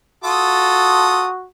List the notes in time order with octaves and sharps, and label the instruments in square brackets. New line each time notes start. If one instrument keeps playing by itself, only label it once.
[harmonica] F4 A4 D#6 [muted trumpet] F#4